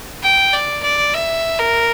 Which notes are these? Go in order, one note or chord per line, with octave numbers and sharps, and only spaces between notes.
G5
D5
D5
E5
A#4